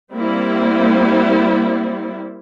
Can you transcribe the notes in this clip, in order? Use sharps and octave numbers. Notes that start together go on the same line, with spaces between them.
G3 A#3 C4 E4